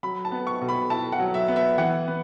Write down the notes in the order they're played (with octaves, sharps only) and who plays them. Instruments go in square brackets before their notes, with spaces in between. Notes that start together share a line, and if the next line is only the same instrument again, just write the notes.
[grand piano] F#3 [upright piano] B5
[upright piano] A5
[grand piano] B3
[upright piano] C#6
[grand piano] B2
[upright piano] B5
[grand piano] E4 [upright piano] A5
[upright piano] F#5
[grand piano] F#3
[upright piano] E5
[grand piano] B3
[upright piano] E5
[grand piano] E3 [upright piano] F#5
[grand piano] B3